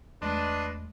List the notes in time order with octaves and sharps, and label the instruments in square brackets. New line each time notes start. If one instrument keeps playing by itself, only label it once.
[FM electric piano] E2 G#3 A3 [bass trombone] D4 [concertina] B4 D#5 C6